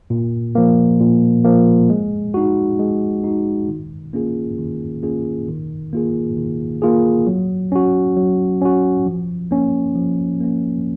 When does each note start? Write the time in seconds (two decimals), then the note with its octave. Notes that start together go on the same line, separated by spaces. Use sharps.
0.10 A#2
0.55 F3 A#3
1.00 A#2
1.44 F3 A#3
1.90 G#3
2.34 D#4 F#4
2.79 G#3
3.24 D#4 F#4
3.68 D#3
4.13 A#3 C#4 F4 G#4
4.58 D#3
5.03 A#3 C#4 F4 G#4
5.48 D#3
5.93 A#3 F4 G#4
6.37 D#3
6.82 A#3 F4 G#4
7.27 F#3
7.72 C#4 F#4
8.17 F#3
8.62 C#4 F#4
9.06 F3
9.51 A#3 C#4
9.96 F3
10.40 A#3 C#4